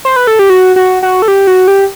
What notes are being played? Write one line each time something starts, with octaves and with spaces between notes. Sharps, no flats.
C5
B4
A4
G4
F#4
F#4
F#4
A4
G4
F#4
G4